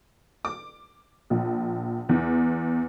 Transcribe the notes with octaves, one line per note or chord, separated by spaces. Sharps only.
D6
A#1
E2